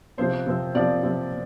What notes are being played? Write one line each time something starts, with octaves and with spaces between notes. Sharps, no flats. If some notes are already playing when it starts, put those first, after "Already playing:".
C3 F3 C4 C5
C3 F3 C4
C3 F3 C4 D5
C3 F3 C4